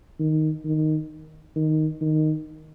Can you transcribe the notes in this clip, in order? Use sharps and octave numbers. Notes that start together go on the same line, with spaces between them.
D#3
D#3
D#3
D#3